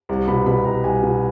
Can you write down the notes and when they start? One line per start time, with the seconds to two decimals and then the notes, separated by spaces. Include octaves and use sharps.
0.09 C2
0.27 B2 B5
0.46 B2 B5
0.65 C2 A#5
0.83 C2 G#5
1.03 B2